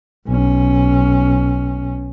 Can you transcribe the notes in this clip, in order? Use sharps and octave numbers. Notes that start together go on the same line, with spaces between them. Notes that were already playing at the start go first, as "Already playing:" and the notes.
B1 C#4